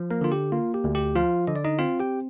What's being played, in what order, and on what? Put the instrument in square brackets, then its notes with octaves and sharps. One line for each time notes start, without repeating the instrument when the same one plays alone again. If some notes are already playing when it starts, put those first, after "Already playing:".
Already playing: [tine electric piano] F3
A#3 A#4
D3 F4
G4
A#3 F4
G4
D2
G4
F3 F4 F5
D3 D#5
D5
D#4 D#5
C4 F4 F5
G4 G5